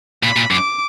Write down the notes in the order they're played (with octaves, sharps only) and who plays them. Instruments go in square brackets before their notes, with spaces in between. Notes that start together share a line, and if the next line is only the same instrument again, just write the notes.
[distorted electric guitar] A#2 [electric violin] B5
[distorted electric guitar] A#2
[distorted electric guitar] F#2 [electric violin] D6